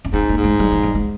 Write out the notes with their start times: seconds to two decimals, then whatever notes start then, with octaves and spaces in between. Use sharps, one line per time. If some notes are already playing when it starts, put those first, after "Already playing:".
0.05 C#4
0.13 G#2 C4
0.29 A#3
0.37 G#2
0.44 G#3
0.60 G3
0.72 F3
0.83 G3
0.95 G#3